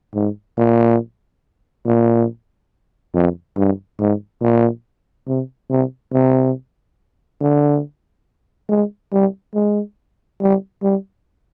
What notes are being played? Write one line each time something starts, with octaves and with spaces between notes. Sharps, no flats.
G#2
A#2
A#2
F2
G2
G#2
A#2
C3
C3
C3
D3
G#3
G3
G#3
G3
G3